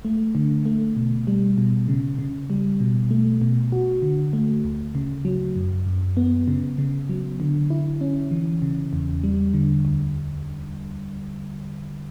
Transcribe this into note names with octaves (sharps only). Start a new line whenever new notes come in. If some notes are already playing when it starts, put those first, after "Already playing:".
A3
D3
A3
B2
G3
B2
C#3
C#3
G3
B2
A3
B2
F#4
D3
A3
D2
C#3
F#3
F#2
F#2
B3
C#3
C#3
F#3
D3
E4
C#4
E3
C#3
E2
G3
D3
D2